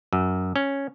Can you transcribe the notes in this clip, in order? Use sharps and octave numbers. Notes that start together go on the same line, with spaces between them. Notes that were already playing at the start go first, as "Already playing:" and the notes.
F#2
C#4